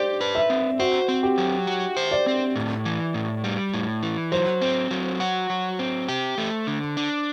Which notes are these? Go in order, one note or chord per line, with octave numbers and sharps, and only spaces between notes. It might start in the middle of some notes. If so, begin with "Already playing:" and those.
Already playing: G4 C5 D5
B4
E5
C4
F#4 C5
C4
G4
F#3
F#4
C5
D5
C4
A2
E3
A2
G3
A2
E3
F#3 C5
C4
F#3
F#4
F#3
C4
G4
A3
D3
D4